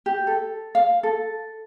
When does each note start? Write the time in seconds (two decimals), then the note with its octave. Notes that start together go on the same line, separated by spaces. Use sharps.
0.06 G4
0.27 A4
0.75 F5
1.03 A4